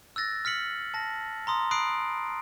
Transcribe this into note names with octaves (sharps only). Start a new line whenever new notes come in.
E6 F#6 A6 A#6
F6 B6 C#7 F#7
A5 A#6
A#5 C6 D#6
B5 D#6 F#6 C7 D7